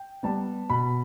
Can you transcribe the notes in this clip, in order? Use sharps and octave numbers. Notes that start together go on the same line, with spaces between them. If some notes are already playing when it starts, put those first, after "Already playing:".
Already playing: G5
G3 B3 A5
B2 B5